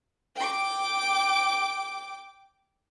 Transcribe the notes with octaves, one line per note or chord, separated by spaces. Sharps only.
G5 D6